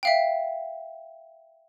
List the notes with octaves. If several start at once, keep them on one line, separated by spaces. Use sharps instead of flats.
E5 F5 G5